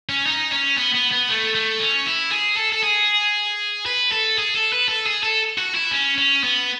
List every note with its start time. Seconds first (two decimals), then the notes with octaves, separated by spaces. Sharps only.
0.09 C#4
0.26 D#4
0.52 C#4
0.77 B3
0.94 B3
1.12 B3
1.29 A3
1.55 A3
1.80 C#4
2.06 E4
2.32 G#4
2.57 A4
2.73 A4
2.83 G#4
3.86 B4
4.11 A4
4.38 G#4
4.55 A4
4.73 B4
4.88 A4
5.06 G#4
5.23 A4
5.58 F#4
5.75 E4
5.91 C#4
6.18 C#4
6.43 B3